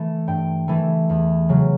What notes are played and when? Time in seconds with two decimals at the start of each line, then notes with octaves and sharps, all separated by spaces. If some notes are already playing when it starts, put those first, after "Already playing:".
Already playing: E3 A3
0.27 G2 G5
0.68 E3 A3
1.09 E2
1.49 C#3 F#3